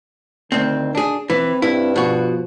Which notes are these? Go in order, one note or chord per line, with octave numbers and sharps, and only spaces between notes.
D2 D#3 C4
D4 G#4
E3 C4 B4
G2 E4
B2 F3 F#4